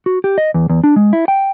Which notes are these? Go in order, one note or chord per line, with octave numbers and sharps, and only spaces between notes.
F#4
G4
D#5
E2
E2
D4
G#3
E4
G5